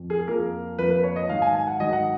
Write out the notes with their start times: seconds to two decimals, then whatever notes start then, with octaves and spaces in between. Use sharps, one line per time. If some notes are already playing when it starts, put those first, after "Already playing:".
Already playing: F2
0.10 G#4
0.27 F2 F3 A#3 A#4
0.78 F2 F3 A#3 B4
0.90 B4
1.03 C#5
1.16 D#5
1.29 G#2 D#3 F#3 F5
1.42 G#5
1.55 G#5
1.67 F#5
1.80 G#2 D#3 F#3 D#5
1.93 F#5